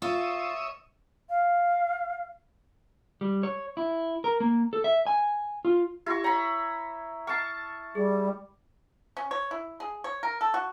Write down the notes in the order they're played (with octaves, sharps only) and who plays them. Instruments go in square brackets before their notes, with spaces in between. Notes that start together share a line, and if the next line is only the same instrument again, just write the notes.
[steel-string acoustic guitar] F4 [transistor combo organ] C#5 E5 D#6
[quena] F5
[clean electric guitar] G3
C#5
E4
A#4
A#3
A4
E5
G#5
F4
[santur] E4 C#6 [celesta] G4 A#6
[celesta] C#5 C#7 [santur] A#5 B5
[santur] A5 C#6 [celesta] F6 A6 C7
[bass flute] G3 [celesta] G#4
[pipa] C#4
C#5
E4
G#4
C#5
A#4
A4
F#4